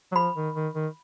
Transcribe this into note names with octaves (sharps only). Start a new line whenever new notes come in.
F#3
F3 B5
D#3
D#3
D#3